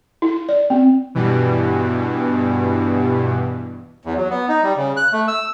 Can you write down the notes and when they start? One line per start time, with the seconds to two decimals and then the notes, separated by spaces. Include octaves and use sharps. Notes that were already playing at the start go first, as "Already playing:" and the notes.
0.22 E4
0.49 D5
0.70 C4
1.15 G2 B2 E3
4.05 E2
4.17 F#3
4.30 B3
4.48 D#4
4.63 G3
4.77 C#3
4.97 F#6
5.12 A3
5.28 E6